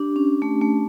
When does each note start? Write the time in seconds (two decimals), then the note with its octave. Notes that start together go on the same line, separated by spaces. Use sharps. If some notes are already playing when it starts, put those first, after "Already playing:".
Already playing: D4 G4
0.16 C#4
0.42 A3
0.61 A3